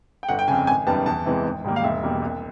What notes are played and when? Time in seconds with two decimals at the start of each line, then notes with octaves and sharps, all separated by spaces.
0.23 G5
0.29 G1 F#5
0.39 G5
0.48 C#3 G#5
0.51 F2
0.67 G#1 G#5
0.87 F#2 D#3 G3 B3 A5
1.06 E2 A5
1.25 C3 E3 G#3 B3
1.44 G#1
1.64 G#2 D#3 G3 A#3
1.76 F5
1.84 E1 E5
2.03 E2 B2 G3 A#3
2.22 C2